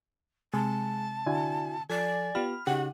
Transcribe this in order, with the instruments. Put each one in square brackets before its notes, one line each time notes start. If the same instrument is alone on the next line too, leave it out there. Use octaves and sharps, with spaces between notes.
[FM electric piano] C3 [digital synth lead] G#3 [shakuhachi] A5
[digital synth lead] D3 [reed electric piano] E4 F#4 G#5
[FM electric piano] F3 [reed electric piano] A4 [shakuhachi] D5 [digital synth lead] G#5
[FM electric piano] B3 F4 G4 [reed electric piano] B5 [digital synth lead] F6
[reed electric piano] C#3 D#4 [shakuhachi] F#4 [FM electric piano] G4 [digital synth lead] F#5